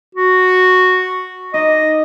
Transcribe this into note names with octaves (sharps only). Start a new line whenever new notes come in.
F#4
D#4 D#5 D6